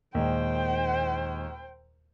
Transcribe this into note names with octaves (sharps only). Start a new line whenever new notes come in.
D#2 A#2 G#3 C5 G5